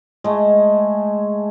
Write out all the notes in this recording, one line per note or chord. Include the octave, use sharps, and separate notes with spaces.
G#3 A3